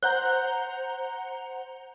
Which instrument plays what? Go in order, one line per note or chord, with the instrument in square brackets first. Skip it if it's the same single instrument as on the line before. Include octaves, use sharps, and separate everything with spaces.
[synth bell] C5 F#5 A#5 [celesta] F#6 G6